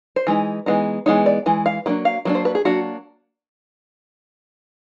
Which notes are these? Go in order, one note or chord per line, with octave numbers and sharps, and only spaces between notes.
C5
E3 G#3 D#4
E3 G#3 B3 D#4
E3 G#3 B3 D#4 C#5
D5
E3 G#3
F5
F#3 A#3 D4
F5
F#3 A#3 D4
C5
B4
G#4
F#3 A#3 D4 F#4